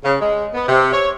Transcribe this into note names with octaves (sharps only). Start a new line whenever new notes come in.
C#3
G#3
B3
C3
C#5